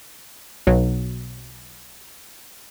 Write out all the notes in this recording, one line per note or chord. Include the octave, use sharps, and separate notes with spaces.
B1 F#3